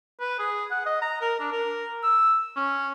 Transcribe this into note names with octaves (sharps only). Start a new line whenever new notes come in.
B4
G#4
F#5
D#5
A#5
A#4
D4
A#4
E6
C#4